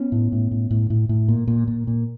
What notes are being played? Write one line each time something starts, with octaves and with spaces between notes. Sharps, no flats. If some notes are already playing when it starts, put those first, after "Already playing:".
Already playing: B3 C#4
A2
A2
A2
A2
A2
A2
A#2
A#2
A#2
A#2